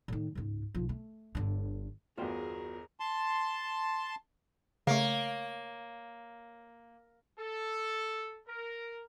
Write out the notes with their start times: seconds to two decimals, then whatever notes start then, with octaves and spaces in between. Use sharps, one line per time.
0.08 A2 D#3
0.35 C#2 G#2
0.75 B1 F3
0.89 A3
1.35 G1 D3
2.17 G1 E2 F4 F#4 G#4 A#4 C5 G5
3.00 A5 C6
4.87 C#3 A3 A#3 C#5 F5
7.39 A4
8.48 A#4